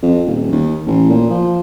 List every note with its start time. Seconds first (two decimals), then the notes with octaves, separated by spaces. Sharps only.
0.03 F2
0.26 D#1
0.52 D#2
0.86 A1
1.09 A#2
1.30 F3